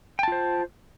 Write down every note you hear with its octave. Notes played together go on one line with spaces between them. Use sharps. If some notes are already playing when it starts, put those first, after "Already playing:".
F4 C5 G5 A5